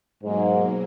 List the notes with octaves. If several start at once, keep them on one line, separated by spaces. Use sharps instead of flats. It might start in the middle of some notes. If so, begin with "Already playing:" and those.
G#2 B2 F#3 A#3